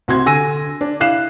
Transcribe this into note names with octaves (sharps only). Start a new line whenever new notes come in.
C2 F#4 C6 G#6
D3 G#5 E6 A#6 D#7
D4
E4 F5 F#6 C7 E7